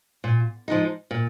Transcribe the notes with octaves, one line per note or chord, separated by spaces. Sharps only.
A#2
F3 G#3 D#4
A#2